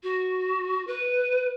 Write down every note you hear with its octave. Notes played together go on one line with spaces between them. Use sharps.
F#4
B4